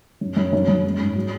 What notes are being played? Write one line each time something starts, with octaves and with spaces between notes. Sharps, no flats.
F#2
F#2
F#2
F#2
G#3
G#2
F#3